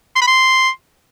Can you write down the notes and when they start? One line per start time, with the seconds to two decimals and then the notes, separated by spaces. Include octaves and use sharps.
0.16 C6
0.22 B5
0.28 C6